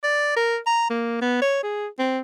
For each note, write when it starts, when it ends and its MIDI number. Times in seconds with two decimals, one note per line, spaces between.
0.04 0.33 74
0.36 0.58 70
0.66 0.88 82
0.90 1.18 58
1.21 1.41 59
1.42 1.62 73
1.63 1.87 68
1.99 2.20 60